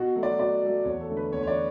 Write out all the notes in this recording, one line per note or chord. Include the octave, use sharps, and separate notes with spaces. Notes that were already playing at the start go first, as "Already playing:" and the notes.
Already playing: B2 F#4
F#3 A3
D5
B2 D5
F#3 A3
E2 C#5
A4
D3 A3
B4
E2 C#5
C#5
D5